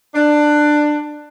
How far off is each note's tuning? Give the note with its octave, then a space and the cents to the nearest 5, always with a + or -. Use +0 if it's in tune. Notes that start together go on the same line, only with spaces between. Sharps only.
D4 +15